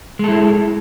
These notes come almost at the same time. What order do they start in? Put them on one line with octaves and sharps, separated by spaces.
G#3 A4 E4